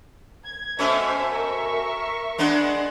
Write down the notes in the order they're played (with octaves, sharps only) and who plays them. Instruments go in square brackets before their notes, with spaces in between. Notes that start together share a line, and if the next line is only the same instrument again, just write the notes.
[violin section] G#6
[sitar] B2 A3 C#4 [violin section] C5 E5
[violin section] A#4 E5 C#6
[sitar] G#3 B3 D4